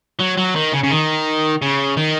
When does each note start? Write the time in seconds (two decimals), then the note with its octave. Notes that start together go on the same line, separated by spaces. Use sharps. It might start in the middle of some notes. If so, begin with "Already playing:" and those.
0.20 F#3
0.38 F#3
0.56 D#3
0.73 C#3
0.83 C#3
0.91 D#3
1.62 C#3
1.97 D#3